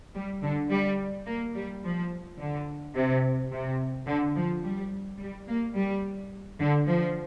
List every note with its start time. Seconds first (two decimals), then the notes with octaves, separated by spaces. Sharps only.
0.15 G3
0.43 D3
0.71 G3
1.26 A#3
1.55 G3
1.83 F3
2.39 D3
2.96 C3
3.51 C3
4.07 D3
4.35 F3
4.63 G3
5.19 G3
5.47 A#3
5.75 G3
6.60 D3
6.87 F3